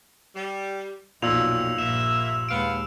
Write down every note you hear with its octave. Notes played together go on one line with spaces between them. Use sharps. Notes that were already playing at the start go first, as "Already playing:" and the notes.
G3
B1 F2 A#2 D#4 E6 F7
A#1 G2 A#3 E5 E7
D#2 G#3 B3 F5 D7